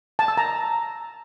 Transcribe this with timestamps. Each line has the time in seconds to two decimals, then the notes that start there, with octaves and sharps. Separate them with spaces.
0.19 A5
0.28 E6
0.37 A#5